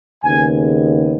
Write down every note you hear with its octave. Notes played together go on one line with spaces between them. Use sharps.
D#2 C#3 G#3 B3 G#5